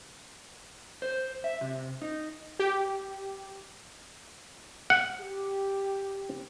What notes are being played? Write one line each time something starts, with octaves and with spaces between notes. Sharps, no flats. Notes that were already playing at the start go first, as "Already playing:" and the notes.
C5
E5
C3
D#4
G4
F#5
G4